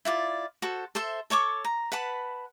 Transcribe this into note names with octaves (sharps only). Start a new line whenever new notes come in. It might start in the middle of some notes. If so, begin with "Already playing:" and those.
E4 F4 D5
F#4 A4 C5
A4 C5 E5 C6
A4 C#5 C#6 D6
A#5
B4 F#5 A5 B5